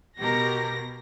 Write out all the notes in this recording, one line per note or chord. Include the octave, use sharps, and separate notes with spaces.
B2 G4 A#4 A#6